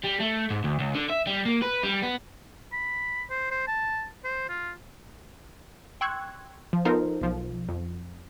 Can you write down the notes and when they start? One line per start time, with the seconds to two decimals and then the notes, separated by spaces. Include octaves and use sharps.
0.04 G3
0.20 A3
0.51 G#2
0.64 D2
0.79 C#2
0.95 D3
1.09 E5
1.27 G3
1.46 A#3
1.62 B4
1.83 G3
2.02 B3
2.73 B5
3.30 C5
3.51 C5
3.68 A5
4.24 C5
4.49 F4
6.01 G5 C6 C#6 E6 F#6 G#6
6.73 F3
6.85 B3 D#4 F4 A4 A#4 C5
7.21 B1 F3
7.69 F2